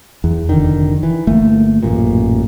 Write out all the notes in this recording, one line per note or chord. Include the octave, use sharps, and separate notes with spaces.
E2
F1 D3 D#3
E3
G1 A3 A#3
A1 F#2 A#2